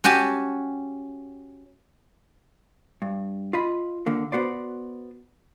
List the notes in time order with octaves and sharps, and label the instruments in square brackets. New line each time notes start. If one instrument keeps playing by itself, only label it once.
[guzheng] C#4 F#4 G4 G#5 A5
[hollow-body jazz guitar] G2
F4 D#5 B5
D#2 D3 A#3
B3 F#4 C5 D5